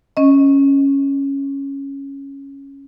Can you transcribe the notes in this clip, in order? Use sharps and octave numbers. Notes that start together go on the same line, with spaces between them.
C#4 D#5